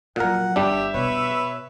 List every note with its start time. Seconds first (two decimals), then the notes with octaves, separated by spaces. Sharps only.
0.16 A#2 F3 F#3 A#4 F#5
0.56 G1 G3 D4 G4 E5
0.94 B2 B4 C#5